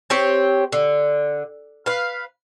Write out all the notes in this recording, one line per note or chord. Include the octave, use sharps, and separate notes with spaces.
C4 G4 C#5
D3
B4 F5